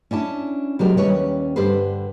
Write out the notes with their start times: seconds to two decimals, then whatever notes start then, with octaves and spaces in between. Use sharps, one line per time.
0.11 C#4 D4 E4 A5
0.79 C3 F#3 G#3 D4 G4 A#4
0.97 D#2 G3 C#4 E4 B4 C#5
1.56 G2 D3 G4 A4 B4 C5